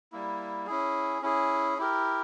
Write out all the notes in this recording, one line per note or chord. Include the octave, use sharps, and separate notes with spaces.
G3 A#3 E4
C#4 E4 G#4
C#4 E4 G#4
E4 G4 A#4